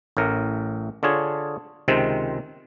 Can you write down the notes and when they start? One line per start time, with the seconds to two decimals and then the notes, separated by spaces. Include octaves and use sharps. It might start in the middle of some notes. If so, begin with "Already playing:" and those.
0.17 A1 A2 A#4
1.03 D3 D4 F4 G#4 C#5
1.88 C#2 C3 D#3 G#3 C4